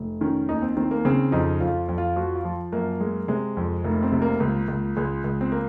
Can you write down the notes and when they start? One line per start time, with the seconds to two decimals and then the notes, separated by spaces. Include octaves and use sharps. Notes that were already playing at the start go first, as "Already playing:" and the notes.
Already playing: F1
0.21 D#3 C#4
0.49 D#2 D#4
0.62 C4
0.77 D#3 C4
0.91 A#3
1.05 C#3 C4
1.32 F2 D#4
1.60 F2 F4
1.89 F2
1.98 F4
2.16 F3 F#4
2.35 F4
2.45 F3
2.72 F#2 A#3
3.00 G#3
3.28 C3 G#3
3.57 F2
3.84 F1 A#3
4.03 C4
4.12 C3
4.22 A#3
4.40 C#2 A#3
4.68 C#2
4.96 C#2 G#3
5.24 C#2
5.41 C4
5.52 A#3